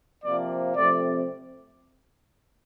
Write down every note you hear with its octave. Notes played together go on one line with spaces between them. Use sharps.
C3 F3 A#3 D5
C3 F3 A3 C4 D5